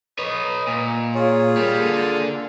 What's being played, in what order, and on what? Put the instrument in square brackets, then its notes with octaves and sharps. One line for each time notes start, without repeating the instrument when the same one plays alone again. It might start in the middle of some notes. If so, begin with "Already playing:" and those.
[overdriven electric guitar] B4 C#5 [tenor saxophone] D#5
[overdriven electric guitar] A#2
[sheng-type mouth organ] F4 G#4 [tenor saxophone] C#5
[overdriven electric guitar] G3 [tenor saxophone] A#3
[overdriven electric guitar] D4 A4